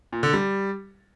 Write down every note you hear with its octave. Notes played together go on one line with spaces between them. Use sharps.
A#2
D3
G3